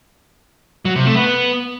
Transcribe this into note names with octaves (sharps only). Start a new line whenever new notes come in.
F#3
C3
A3
B3